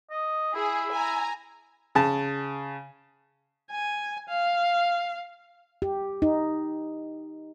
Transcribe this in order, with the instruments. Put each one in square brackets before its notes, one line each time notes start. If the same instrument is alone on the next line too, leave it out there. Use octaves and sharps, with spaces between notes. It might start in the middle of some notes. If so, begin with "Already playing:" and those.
[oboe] D#5
[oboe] E4 [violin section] G#4
[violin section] G#5 A#5
[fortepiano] C#3 A5
[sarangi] G#5
F5
[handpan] G4
D#4